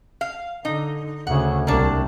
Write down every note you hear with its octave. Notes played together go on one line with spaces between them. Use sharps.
F5
D3 D#4
D2 C#3 F#5
C2 A#3 D4